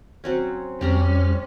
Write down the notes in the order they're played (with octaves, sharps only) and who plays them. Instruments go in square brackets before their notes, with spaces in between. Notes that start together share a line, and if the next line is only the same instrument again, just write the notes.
[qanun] F#3 C4 C#4
[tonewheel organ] F2 G3 F6 [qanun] C4 G4 A#5 [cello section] C#4